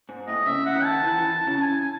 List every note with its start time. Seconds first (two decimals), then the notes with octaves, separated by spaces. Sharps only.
0.09 G#2
0.28 A2 D#5
0.46 C#3 E5
0.66 F#5
0.76 D#3
0.84 A5
1.04 E3
1.18 E3
1.47 C#3
1.57 A5
1.61 G#5
1.81 G#5